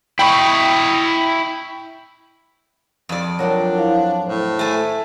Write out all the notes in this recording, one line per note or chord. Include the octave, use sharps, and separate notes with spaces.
E4 D#5 G5 B5 C#6
F2 D5
F#3 D4 F4 A#4 F#5 G5 D6
E4 C5 F5
A2 C5
A3 G#5